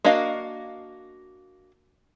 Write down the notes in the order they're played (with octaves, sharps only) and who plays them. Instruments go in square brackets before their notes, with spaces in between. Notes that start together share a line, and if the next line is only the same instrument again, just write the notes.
[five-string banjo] A#3 D4 F#4 D#5 F5